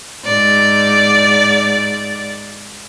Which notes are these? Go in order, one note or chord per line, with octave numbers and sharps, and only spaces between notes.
G#2 D5